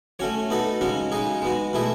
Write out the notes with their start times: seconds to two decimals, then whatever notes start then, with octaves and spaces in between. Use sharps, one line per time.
0.19 A3 C#4 F#4 C#5
0.50 B3 D#4 F#4 A4
0.81 C#3 G#3 C#4 F#4
1.12 C#3 G#3 D#4 G#4
1.42 G#3 B3 F#4
1.73 B2 A3 E4 G#4